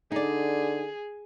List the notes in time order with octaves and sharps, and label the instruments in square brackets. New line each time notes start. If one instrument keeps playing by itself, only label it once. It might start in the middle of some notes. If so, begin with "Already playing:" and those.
[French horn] D3 [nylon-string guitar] D#4 D5 [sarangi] G#4